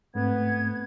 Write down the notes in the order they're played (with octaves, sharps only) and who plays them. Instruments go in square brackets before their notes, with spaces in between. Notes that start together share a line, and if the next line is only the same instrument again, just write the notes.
[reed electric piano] G#2 A3 C4 [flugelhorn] B3 [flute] G#6